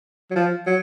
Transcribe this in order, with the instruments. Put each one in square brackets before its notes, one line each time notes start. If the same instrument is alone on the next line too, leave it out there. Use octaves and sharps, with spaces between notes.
[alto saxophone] F#3
F3
F#3